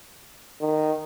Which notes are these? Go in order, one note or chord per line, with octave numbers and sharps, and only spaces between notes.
D#3